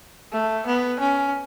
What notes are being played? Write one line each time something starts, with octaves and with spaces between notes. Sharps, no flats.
A3
B3
C#4